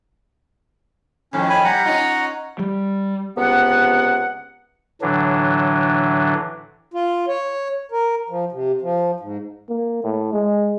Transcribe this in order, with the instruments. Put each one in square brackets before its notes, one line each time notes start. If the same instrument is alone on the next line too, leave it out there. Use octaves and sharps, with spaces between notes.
[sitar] F2 A2 D#3 [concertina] C#4
[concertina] G#5 B5
[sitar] G3 [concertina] F#5 A#5
[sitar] C#4 D#4 F4
[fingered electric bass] G3
[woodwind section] C#2 C3 B3 F#5
[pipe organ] A2 D3 E3 F#3 D4
[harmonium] F4
C#5
A#4
F3
C3
F3
G#2
[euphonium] A#3
A2
G#3